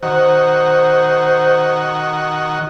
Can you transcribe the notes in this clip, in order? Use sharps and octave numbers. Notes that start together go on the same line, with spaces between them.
D#3 F#4 C5